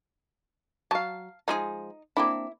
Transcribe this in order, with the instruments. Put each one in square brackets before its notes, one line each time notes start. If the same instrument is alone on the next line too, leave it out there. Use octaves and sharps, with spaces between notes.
[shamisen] F#3 [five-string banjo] F5 A5
[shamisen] F3 G#3 G#4 [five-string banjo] D#4
[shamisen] A#3 C4 D4 [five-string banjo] E4